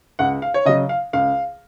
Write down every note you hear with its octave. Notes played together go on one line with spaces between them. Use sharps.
C#2 F#5
F5
C#5
C#3 F#3 D#5
F5
C#2 F5